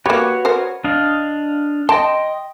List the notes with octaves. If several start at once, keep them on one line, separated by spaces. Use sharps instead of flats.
A#3 F#4 G4 B4 C#5
A#4 C5
D4 D#5 F5
D#5 G5 A5 C6